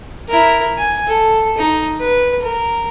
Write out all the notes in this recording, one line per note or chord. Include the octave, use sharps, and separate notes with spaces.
E4 A#4
G#5
A4
D#4
B4
A#4